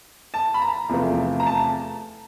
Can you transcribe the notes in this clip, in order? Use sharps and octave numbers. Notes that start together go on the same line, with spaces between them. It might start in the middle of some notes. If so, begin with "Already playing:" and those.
A5
B5
A#5
E2 C3 F3 A3
A#5
A5